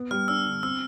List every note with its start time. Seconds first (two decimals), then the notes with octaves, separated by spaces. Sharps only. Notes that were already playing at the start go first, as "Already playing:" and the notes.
Already playing: B3
0.11 G3 F6
0.28 D4 E6
0.46 D3
0.63 C4 E6